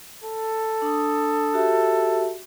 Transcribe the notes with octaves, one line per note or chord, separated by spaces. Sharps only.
A4
D4 D#6
F#4 G4 E5